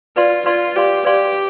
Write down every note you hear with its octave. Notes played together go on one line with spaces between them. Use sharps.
F4 B4 D5 F5 C6
F4 B4 D5 F5 C6
G4 B4 D5 F5 C6
G4 B4 D5 F5 C6